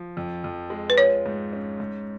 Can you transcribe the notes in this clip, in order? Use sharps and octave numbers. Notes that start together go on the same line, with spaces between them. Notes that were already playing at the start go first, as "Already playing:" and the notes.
Already playing: F3
F2
F2
G#3
B4
F4 C#5
G#2
C#4
G#2